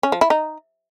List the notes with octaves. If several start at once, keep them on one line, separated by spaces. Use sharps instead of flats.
C#4
F3
E4
D#4